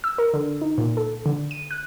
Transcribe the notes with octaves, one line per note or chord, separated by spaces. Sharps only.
E6
A#4
D3
D#4
A#2
A4
D3
D#7
F#6